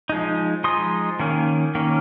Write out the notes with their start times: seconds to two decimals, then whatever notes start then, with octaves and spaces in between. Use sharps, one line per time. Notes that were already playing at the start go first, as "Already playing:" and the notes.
0.09 F3 G#3 D#4
0.64 F3 G#3 D#4 C6 D#6
1.19 D#3 A#3 C#4
1.75 D#3 A#3 C#4